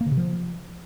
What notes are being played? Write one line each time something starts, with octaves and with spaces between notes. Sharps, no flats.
A#3
D3
C3
F3